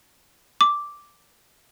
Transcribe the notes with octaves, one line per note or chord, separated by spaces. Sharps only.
D6